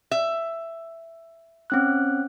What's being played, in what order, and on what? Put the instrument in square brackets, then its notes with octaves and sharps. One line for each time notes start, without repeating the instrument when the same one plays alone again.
[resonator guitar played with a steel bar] E5
[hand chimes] C4 C#4 F#6